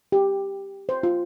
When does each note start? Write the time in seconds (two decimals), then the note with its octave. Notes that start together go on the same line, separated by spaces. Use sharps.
0.12 G4
0.89 C5
1.03 F4